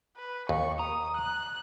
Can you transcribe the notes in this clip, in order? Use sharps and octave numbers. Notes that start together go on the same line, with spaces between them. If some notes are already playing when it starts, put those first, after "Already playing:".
B4
D#2 C#6
A#5 D#6
F#6